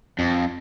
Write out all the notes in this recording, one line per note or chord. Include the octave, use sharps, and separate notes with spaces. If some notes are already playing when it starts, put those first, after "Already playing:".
F2